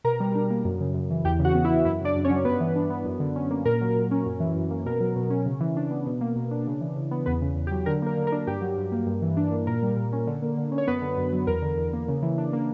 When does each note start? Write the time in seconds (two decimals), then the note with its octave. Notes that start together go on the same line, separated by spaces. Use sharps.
0.04 B2 A#4 A#5
0.20 G3
0.35 D4
0.50 A#3
0.65 F#2
0.80 C#3
0.94 F#2
1.10 E3
1.25 E2 G4 G5
1.39 C#3
1.45 F#4 F#5
1.54 B3
1.64 E4 E5
1.71 E3
1.85 F#2 E4 E5
2.01 C#3 D4 D5
2.15 F#2
2.25 C#4 C#5
2.30 F#3
2.45 G2 B3 B4
2.60 E3
2.75 D4
2.90 B3
3.05 F#2
3.20 D3
3.36 C#4
3.51 A#3
3.65 A#2 A#4
3.81 F#3
3.95 A#2
4.11 C#4
4.26 F#2
4.40 E3
4.56 F#2
4.71 A#3
4.86 B2 A#4
5.00 F#3
5.16 B2
5.30 C#4
5.46 C#3
5.61 E3
5.77 D4
5.91 B3
6.07 B2
6.21 A#3
6.36 B2
6.51 D4
6.67 C#3
6.81 E3
6.96 C#3
7.11 B3
7.26 E2 B3 B4
7.42 C#3
7.56 E2
7.67 G4
7.71 F#3
7.86 D3 A#4
8.02 A#3 A#4
8.17 D3
8.27 A#4
8.32 D4
8.47 G2 G4
8.61 F#3
8.77 G2
8.92 A#3
9.06 G2
9.22 E3
9.37 D4
9.52 A#3
9.67 A#2 A#4
9.83 G3
9.97 A#2
10.13 C#4
10.27 D3
10.42 A#3
10.57 D3
10.72 C#4
10.78 C#5
10.87 F#2 B3 B4
11.02 D3
11.17 F#2
11.32 F#3
11.47 E2 A#4
11.62 D3
11.78 E2
11.93 A#3
12.08 C#3
12.22 E3
12.38 D4
12.53 A#3